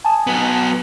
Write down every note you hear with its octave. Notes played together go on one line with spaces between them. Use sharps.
G#5 A5 D#6
F#3 B3